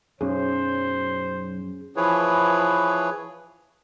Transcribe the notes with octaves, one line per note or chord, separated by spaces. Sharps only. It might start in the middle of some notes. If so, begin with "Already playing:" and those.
B1 F#2 C#4 G#4 C5
E3 F3 E4 G#4 B4 C#5